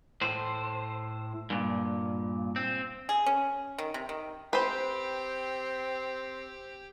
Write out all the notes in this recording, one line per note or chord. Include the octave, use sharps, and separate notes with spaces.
A2 C5
G2 A#2
C4
G#4
C#4
D#3
C3
D#3
C4 G4 B4 C5